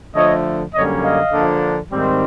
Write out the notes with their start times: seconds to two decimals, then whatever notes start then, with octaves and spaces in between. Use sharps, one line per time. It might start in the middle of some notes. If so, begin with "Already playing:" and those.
0.15 D3 F3 A3 C#5 D#5
0.74 F#2 D3 G3 A#3 C#4 C#5 D#5
1.03 D#5 F5
1.32 D3 F3 A#3 D4
1.90 G#2 D#3 G3 C4